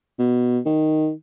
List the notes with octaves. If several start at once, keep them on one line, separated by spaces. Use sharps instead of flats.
B2
D#3